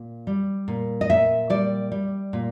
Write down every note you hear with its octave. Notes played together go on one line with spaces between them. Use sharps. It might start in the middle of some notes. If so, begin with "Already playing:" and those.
Already playing: A#2
G3
A#2
D#5
A#2 E5
G3 D5
G3
A#2